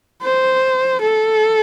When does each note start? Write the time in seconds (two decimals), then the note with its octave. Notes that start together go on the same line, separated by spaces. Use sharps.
0.22 C5
1.02 A4